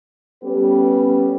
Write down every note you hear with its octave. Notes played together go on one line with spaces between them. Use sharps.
G3 B3 C#4 G4 A4 B4